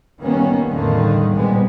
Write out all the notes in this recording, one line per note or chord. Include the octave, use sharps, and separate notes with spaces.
D#3 G3 A#3 B3 C#4
E2 A2 D3 D#3 G3 A#3
A#2 G3 G#3 B3 C4